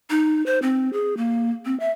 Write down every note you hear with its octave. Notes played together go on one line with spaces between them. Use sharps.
D#4
C5
C4
G#4
A#3
C4
E5